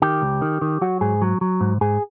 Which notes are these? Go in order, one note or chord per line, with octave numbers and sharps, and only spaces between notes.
D#3 G4
C#2
D#3
D#3
F#3 F#4
G#2 G#4
F#3
F#3
G#2
G#2 G#4